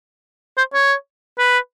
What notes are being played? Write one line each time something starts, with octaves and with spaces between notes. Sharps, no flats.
C5
C#5
B4